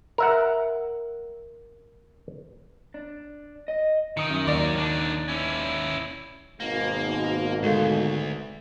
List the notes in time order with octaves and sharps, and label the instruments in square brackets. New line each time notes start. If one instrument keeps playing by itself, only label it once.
[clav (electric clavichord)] A#4 E5 F#5
[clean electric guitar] D4
D#5
[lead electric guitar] D#3 [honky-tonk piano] D#6 C#7
[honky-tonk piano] F#2
[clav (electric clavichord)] D#2 [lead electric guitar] F#3 A#4 [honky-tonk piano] D5
[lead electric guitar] D#3 D4
C#4 E4
[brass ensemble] G#1 G#2 B2 [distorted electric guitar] A#3
[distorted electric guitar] D2 [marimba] G#3 A4 F5